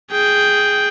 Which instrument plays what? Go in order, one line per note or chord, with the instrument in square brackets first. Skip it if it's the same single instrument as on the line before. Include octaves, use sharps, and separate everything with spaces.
[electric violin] G#4 G5